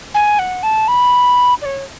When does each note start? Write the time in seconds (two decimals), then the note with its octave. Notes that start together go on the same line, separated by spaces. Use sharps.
0.14 G#5
0.39 F#5
0.63 A5
0.88 B5
1.62 D5
1.65 C#5